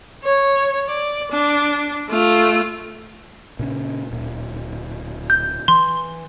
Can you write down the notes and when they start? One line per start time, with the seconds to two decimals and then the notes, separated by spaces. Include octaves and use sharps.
0.23 C#5
0.87 D5
1.32 D4
2.10 A3 F4
3.59 A#2 C#3 C#4
4.11 D1 A#2
5.30 G6
5.68 E3 C6